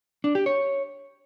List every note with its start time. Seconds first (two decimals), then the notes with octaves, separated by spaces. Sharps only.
0.24 D4
0.35 G4
0.46 C#5